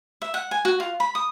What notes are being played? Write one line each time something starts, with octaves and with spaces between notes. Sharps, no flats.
E5
F#5
G#5
F#4
F4
B5
D#6